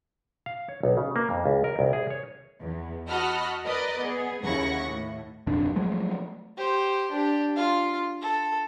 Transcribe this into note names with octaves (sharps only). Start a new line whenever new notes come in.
F5
C#5
B1
C#3
A#3
F2
C#2
A#4
C2
G#4
C#5
E2
F#4 D#5 F#5 A5 B5 F6
A#4 B4 D5 D#5
B3 G#4
D#2 C#3 E4 F#5 C#6 A#6
A2
D1 B1 F2 D4
F3 F#3 G#3 A3
G4 C5
D4 G4
F4 F5
A4